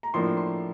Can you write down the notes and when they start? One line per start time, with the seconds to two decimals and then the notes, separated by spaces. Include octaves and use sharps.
0.03 A#5
0.14 A2 F3 A#3 D4 C6
0.37 C6